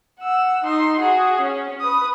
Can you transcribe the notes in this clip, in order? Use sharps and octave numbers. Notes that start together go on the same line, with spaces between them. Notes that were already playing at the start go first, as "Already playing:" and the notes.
F#5 E6
D#4 C6
F#4 G#4
C#4
B4 D#6